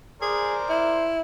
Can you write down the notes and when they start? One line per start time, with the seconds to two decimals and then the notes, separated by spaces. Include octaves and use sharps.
0.22 G#4 A#4 C5 D5
0.69 E4